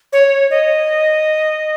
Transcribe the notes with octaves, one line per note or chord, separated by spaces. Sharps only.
C#5
D#5